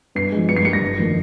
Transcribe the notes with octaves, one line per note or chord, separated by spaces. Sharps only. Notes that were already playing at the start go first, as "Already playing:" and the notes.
G2 C7
F3 G#3
G2 C#7
C7
G3 A#3 C#7
A#6
G1
F2 D#3 A#3